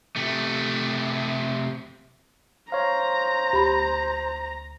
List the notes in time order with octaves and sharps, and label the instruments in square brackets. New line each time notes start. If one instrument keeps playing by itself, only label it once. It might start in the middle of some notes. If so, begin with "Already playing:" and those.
[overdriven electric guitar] C3 A3
[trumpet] C5 [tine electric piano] C#5 F5 [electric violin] A#5
[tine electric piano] D2 [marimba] G4 B5